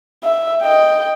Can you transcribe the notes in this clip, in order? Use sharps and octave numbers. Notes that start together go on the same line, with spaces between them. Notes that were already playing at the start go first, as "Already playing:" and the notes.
E5
D#5 G5